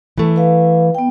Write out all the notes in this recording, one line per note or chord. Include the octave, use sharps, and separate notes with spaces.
E3 A3
B4 F5
B3 G5